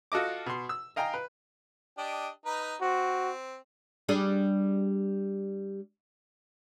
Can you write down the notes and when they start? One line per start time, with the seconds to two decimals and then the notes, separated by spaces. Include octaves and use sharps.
0.12 F4 F#4 A4 D#5 D6
0.46 B2 C6
0.69 E6
0.96 D#5 F5 G5 G#5 A#5
1.14 B4
1.98 D4 G4 D#5
2.46 D#4 B4 A#5
2.81 C4 F#4
4.09 G3 D4 G#4